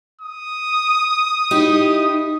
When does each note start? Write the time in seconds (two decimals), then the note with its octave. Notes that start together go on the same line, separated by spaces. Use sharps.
0.21 D#6
1.51 D#4 E4 G4